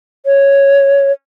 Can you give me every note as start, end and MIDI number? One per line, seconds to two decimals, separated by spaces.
0.26 1.12 73